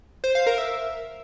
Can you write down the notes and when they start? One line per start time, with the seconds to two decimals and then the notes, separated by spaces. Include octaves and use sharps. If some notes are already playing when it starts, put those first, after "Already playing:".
0.24 C5
0.35 F5
0.46 A#4
0.58 E5